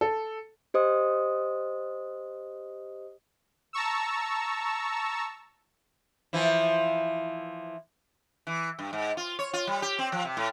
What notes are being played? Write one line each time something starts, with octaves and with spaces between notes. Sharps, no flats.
A4
G4 C5 D#5 D#6
A5 A#5 C#6 E6
E3 F3 E4
E3
G2
G#2
F4
C#5
F4
G3
G4
C4
F3
C3
A2